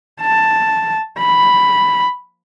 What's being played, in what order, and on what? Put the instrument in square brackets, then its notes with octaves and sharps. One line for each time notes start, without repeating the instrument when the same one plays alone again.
[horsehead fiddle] A5
B5